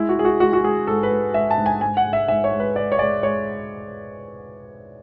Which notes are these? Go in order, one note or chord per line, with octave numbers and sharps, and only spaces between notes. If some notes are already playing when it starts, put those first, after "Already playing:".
Already playing: G#3 E4
F#4
G#3 G#4
F#4
G#3 F#4
F#4
G#3 G#4
G#2 A4
B4
G#3
G#3 E5
A5
G#2
G#5
G#2 G#5
F#5
G#3
E5
G#2 E5
C#5
G#3
B4
G#3 D5
C#5
G#3 D5
G#3 C#5